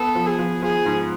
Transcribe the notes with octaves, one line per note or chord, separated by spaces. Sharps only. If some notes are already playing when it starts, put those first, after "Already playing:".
Already playing: B3 A4
F3
G#4
F3
F3 G#4
G#2